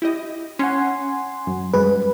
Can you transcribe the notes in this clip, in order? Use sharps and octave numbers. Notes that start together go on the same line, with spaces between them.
E4 G4 D#5
C#4 F#5 G#5 C6
F#2
F#2 G3 G#3 B4